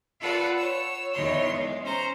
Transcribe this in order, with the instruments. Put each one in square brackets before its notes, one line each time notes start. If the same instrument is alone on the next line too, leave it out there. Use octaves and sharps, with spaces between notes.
[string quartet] F4 A4 B4 D5 F#5
C#5 E6
E2 D#3 C#5 C6
G#3
C#4 C5 A#5